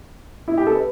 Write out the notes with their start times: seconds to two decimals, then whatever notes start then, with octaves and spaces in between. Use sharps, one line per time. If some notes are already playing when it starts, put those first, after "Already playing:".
0.48 E4
0.57 G4
0.67 A4
0.75 B4